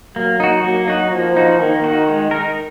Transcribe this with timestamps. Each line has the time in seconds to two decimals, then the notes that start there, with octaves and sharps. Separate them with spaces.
0.16 F#3 A#3
0.40 D#4 F#4
0.64 F#3 A#3
0.88 D#4 F#4
1.11 F3 A#3
1.37 D#4 F#4
1.59 D#3 A#3
1.84 D#4 F#4
2.08 G#3
2.31 D#4 A#4